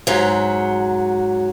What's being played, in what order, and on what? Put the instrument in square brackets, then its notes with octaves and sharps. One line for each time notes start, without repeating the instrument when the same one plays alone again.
[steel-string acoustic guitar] G#2 F#3